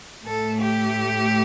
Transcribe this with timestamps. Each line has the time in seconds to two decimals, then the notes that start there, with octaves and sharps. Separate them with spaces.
0.25 A2 A3 A4
0.61 G4